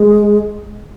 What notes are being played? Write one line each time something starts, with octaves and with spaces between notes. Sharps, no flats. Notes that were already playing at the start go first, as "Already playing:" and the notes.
Already playing: G#3